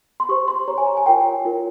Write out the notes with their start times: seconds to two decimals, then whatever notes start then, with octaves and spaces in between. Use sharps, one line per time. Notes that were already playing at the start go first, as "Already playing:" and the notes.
0.20 C6
0.29 G4 C5 C#6
0.48 C6
0.68 G4 C#5 A#5
0.78 G#5
0.86 A#5
0.97 G#5
1.06 F4 A#4 C#5 G5
1.45 F4 A#4 C#5